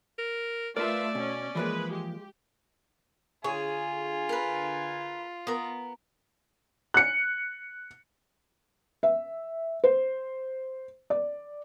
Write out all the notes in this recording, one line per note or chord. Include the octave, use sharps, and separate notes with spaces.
A#4
A3 F4 A#4 B4 D5 E5 A5
B2 C#4
E3 F3 G#3 A#3 B4
G4
D3 F4 G#4 C#5 G#5
A#4 B4
B3 A#4 D#6
F#6 C#7
E5
C5
D5